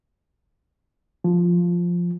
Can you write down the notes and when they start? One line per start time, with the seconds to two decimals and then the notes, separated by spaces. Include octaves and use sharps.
1.24 F3